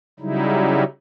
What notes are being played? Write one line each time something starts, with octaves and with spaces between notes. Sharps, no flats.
C#3 F#3 G3 D#4 E4